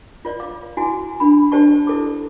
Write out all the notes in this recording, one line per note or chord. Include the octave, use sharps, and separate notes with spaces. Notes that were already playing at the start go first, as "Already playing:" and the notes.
F4 C#5 D5
F5 D6
E4 F#4 G#5
D4 B5
D4 G4 C5 D5 A5 C#6
E4 A4 D6